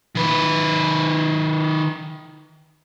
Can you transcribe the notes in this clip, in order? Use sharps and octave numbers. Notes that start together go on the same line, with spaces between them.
D#3 B4